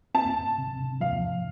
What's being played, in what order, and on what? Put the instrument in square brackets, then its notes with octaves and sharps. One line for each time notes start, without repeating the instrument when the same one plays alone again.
[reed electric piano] C4 [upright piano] A5
[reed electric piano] C3
[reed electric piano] F3 [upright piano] F5